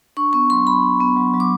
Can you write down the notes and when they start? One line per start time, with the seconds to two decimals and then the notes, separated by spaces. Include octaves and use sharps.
0.17 D4 C#6
0.33 B3 C#6
0.50 F#3 C6
0.66 F#3 B5
0.83 D4
1.00 B3
1.17 F#3
1.34 F#3
1.40 D6